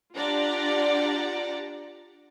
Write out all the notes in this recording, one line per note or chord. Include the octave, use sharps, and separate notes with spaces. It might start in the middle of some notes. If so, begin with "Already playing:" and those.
D4 F4 G4 D5 F#5 A#5